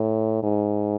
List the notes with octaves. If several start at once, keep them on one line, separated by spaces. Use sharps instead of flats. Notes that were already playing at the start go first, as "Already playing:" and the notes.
Already playing: A2
G#2